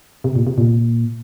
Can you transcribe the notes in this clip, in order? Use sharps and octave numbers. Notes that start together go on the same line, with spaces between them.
C3
A#2
C3
A#2